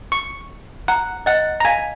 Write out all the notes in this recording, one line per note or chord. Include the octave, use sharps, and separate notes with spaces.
C#6
F#5 A#5
D#5 F#5
A#5
F5 G#5